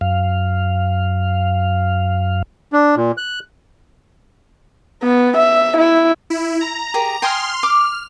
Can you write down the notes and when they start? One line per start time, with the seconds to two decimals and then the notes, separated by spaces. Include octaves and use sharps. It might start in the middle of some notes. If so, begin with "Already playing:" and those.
0.01 F#2 F5
2.73 D4
2.97 A#2
3.17 F#6
5.03 B3
5.37 E5
5.78 E4
6.30 E4
6.61 A#5
6.94 G4 G#4 A#4
7.22 G5 G#5 C6 D#6 F6
7.63 D6 F6